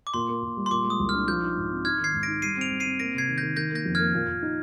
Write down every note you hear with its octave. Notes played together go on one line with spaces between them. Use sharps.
D6
A#2 C6
A#3
A#2
G3
C6
A#2 D6
G#3
D#6
C2
F6
D4
F3 G6
D#4
G#2
C4
D#4 F6 G#6
D#3 G#6 C7
G#2
A#6 D7
D#4
G3 C7 D#7
C4 D7 F7
G3
C7 D#7
C4
A#3 A#6 D7
C3 G#6 C7
D#3
G6 A#6
D#3
D#3 G6 A#6
A#3 G6 A#6
F2
A#3 F6 G#6
A#2
A#2
D#4